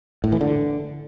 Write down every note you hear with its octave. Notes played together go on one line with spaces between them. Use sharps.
A2
E3
D3